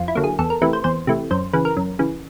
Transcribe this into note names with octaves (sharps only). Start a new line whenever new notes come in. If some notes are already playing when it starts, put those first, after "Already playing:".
Already playing: F2 F4
E4
D3 F#3 A#3
G#4
E2 A4
A#4
C3 E3 A3 B4
C5
E2 C5
C3 E3 A3
F#2 C5
C#3 E3 B4
A#4
F#2
C#3 E3